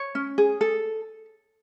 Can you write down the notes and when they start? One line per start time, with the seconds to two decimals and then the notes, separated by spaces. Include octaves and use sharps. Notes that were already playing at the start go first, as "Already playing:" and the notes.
Already playing: C#5
0.15 C#4
0.38 G#4
0.61 A4